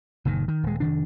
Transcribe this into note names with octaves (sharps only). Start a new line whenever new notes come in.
F#1 A#2 D#3
D#3
D#1 G#3
F1 D#3 D4